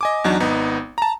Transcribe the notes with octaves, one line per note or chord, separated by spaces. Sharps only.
D#5 G#5 D6
E2 F#3 D4 D#4
G#1 B3 D#4
A5 A#5